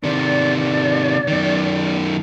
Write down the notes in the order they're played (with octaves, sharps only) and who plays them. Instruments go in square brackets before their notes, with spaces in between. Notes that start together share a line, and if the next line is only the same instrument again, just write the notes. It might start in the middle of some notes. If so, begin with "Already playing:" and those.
[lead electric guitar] C3 D#3 [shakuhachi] D5
[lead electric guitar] F#2 D#3